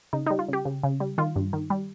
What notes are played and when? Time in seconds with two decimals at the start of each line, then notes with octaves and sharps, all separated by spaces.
0.13 C#3 D#4
0.26 G3 D#4
0.39 F4
0.48 C#3 G4
0.65 C#3
0.83 C#3
1.00 G3
1.18 D#3 F4
1.36 G2
1.53 D#3
1.70 G3